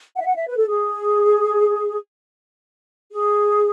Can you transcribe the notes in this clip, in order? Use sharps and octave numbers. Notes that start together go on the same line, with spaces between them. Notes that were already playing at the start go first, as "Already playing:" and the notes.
F#5
E5
F#5
E5
B4
A4
G#4
G#4